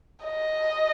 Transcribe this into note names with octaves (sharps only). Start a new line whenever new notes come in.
D#5